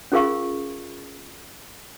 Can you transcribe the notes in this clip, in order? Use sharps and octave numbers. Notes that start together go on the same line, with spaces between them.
C#4 F4 G#4 A#4 F5 C#6